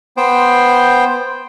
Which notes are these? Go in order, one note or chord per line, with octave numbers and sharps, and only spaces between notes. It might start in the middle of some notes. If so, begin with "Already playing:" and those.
B3 C5 G5